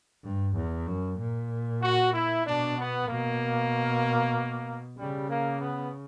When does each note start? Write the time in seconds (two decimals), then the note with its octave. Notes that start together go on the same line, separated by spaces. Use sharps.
0.24 G2
0.56 E2
0.87 F#2
1.19 A#2
1.82 F#4
2.14 E4
2.45 B2 D4
2.78 B3
3.08 B2 A#3
4.98 C#3 G3
5.29 A#3
5.61 B3